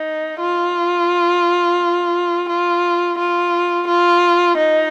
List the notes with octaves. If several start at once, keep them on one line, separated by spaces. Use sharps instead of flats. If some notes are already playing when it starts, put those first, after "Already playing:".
Already playing: D#4
F4
F4
F4
F4
D#4